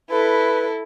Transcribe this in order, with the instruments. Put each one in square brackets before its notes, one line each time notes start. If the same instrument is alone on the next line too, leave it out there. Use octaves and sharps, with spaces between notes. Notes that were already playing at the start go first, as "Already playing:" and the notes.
[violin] E4 A4 [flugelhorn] B4